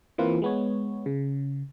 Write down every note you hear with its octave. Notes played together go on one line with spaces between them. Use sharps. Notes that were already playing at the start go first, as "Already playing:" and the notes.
E3 A#3 C4 F4 B4
G#3 B3 C#5
C#3